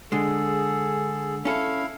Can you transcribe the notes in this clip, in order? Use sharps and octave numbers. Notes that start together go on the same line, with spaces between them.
D3 G#3 G#4 A4
C#4 E4 A4 F5